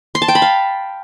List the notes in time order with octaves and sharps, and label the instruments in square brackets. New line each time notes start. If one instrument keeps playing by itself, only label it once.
[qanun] C6
A5
G5
B5
F5